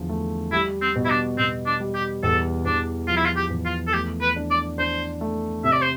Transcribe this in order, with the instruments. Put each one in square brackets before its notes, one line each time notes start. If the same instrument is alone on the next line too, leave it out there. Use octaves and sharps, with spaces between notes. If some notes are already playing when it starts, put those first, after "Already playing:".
Already playing: [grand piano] E2 D3 F3
A3
[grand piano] G3 [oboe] E4
[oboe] C4
[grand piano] B2
[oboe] E4
D4
[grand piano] B2 [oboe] C4
[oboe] D4
[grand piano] G3
[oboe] G4
[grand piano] E2 [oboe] A4
[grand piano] E2 [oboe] D4
[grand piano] F3 [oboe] F4
[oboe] E4
F4
G4
[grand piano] E2
[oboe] F4
A4
[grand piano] A3 [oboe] G4
[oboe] B4
[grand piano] D4
[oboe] D5
[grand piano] D4 [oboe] C5
[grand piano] A3
[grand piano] C3 [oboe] E5
[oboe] D5
C5